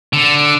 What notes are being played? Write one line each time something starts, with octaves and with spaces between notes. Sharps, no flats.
D3